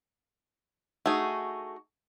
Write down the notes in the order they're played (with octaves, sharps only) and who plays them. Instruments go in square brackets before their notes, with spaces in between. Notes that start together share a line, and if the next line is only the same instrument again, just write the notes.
[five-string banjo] A3 G#4 [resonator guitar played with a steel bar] D#4 F#4